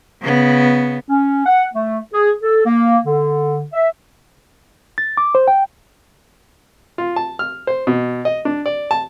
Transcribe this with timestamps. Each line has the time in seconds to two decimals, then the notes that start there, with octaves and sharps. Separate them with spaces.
0.22 C#3 B3
1.09 C#4
1.46 F#5
1.74 A3
2.13 G#4
2.43 A4
2.66 A#3
3.05 D3
3.73 E5
4.98 A6
5.17 D6
5.35 C5
5.48 G5
6.98 F4
7.16 A5
7.39 F6
7.67 C5
7.87 B2
8.25 D#5
8.45 D4
8.66 D5
8.91 A5